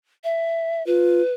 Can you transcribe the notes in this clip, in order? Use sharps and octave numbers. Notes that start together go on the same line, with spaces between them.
E5
F4 B4